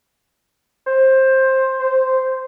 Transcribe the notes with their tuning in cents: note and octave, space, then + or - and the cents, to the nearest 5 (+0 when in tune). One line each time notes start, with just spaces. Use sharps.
C5 +15
C5 -5